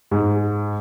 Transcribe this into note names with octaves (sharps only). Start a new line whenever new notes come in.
G#2